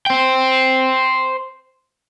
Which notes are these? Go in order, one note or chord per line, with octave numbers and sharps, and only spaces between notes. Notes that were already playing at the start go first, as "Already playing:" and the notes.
C5 G5